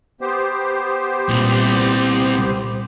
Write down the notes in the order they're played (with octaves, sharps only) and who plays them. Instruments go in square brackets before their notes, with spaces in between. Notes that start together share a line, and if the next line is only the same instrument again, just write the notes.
[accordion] B3 G4 C5
[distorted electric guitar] C2 [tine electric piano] A#2